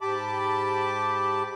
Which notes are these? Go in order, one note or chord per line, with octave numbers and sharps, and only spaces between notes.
G#2 G4 A5 B5 D6